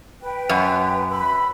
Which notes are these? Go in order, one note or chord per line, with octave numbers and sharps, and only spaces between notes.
B4 G5
F#2
B4 B5 E6